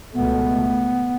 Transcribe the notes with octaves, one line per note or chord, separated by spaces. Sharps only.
C#2 B2 A3 B3